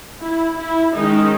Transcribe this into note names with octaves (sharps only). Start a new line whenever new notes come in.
E4
E4
D#3 G#3 C#4 D#4